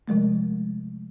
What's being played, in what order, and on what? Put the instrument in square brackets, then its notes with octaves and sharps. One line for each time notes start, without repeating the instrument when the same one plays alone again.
[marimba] C3 F3 G#3 A3